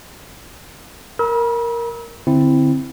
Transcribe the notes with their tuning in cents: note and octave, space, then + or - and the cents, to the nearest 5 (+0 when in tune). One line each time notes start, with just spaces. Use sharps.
A#4 +0 B5 -40 E6 -35
D3 +0 C4 +0 E4 +0